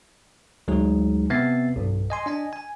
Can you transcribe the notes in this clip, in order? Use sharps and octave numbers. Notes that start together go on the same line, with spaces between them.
D2 F#3 G#3 D#4 G#4
C3 B3 C4 E5 A6 C7
B1 G2
D#5 G#5 C6
D4 D#5 G#5
G#5